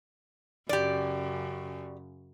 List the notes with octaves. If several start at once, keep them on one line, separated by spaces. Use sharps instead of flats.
F#2 C#3 G4 D5